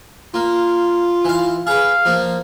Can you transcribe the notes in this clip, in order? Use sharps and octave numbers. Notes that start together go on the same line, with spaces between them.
A#3 F4
E3 F5
G#4 B4 F5
F3 A#3